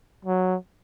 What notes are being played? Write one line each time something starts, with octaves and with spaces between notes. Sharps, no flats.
F#3